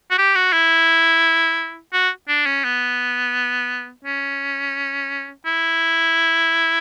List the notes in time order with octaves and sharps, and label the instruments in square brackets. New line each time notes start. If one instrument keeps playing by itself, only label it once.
[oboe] F#4
G4
F#4
E4
F#4
D4
C#4
B3
C#4
E4